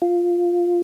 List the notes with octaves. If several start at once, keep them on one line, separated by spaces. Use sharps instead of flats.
F4